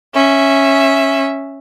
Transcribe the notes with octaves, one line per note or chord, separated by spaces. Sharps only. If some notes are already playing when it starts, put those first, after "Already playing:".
C#4 E5